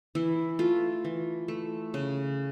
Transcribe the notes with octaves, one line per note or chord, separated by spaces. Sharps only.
E3 E4
A3 F4
E3
A3
C#3